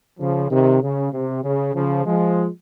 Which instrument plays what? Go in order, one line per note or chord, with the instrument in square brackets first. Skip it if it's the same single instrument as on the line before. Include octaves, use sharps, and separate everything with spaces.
[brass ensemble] C#3 F3
C3 D#3
C#3
C3
C#3
C#3 F3
F3 G#3